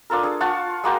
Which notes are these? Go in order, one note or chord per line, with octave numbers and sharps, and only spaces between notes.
D4 F4 A4 A#4
D4 G#4
F4 F#5 A5 C#6
G#3 A#3 F#4 G5